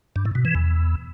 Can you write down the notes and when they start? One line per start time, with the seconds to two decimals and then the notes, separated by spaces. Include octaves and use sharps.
0.16 G2
0.25 A2
0.35 B2
0.45 E3
0.55 E2